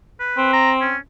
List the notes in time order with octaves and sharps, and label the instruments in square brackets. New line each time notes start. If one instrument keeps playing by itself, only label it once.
[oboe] B4
[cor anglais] C4
[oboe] A#5
C#4